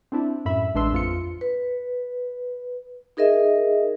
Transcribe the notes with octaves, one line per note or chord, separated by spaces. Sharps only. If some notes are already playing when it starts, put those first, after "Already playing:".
C4 D4 E4
F#2 A2 E5 B5
A1 G#3 D4 B4 C6 E6
F2 F4 C#7
B4
D#4 G#4 A#4 D#5 E5